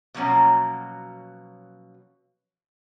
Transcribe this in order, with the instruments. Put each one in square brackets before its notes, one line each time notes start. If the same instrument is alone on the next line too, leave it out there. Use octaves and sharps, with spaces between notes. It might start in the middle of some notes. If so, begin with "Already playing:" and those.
[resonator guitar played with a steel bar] B2 F3 F#3 A#3 C#4 F#4